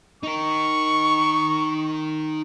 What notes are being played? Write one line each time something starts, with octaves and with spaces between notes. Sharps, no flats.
D#4 A#4 C#6